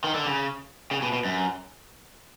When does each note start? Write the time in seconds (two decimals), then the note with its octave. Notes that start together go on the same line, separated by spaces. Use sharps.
0.04 D#3
0.15 D3
0.26 C#3
0.91 C#3
1.02 B2
1.13 B2
1.25 F#2